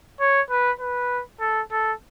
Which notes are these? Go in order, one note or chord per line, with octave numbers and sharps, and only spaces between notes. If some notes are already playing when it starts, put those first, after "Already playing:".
C#5
B4
B4
A4
A4